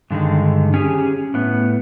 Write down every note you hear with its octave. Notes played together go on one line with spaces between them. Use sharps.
G2 D3 D#3 G#3
C#4 G4 G#4
A2 B3